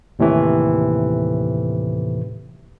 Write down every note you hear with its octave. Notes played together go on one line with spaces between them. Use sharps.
D#2 A2 C3 E3